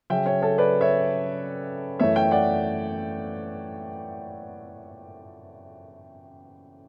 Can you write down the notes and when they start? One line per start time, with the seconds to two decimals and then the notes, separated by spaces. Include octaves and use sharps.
0.10 C#3 F#3 C#4 E5 G5
0.26 C#5 E5
0.42 A4 C#5
0.58 B4 D5
0.81 C#5 E5
2.00 F#2 E3 A3 C#5 E5
2.16 E5 G5
2.31 D5 F#5